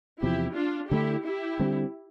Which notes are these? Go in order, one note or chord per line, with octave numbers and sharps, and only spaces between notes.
E2 C3 F3 E4 G4
D4 F4
D3 A3 D4 E4 G4
E4 G4
D3 G3 C4